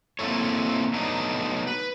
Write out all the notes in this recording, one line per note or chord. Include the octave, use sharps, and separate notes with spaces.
A#3 C4 E4 A4 C#5
F#3 A3 B3 D4 D#4
B4